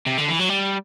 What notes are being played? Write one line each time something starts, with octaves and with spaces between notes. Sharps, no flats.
C3
D3
E3
F#3
G3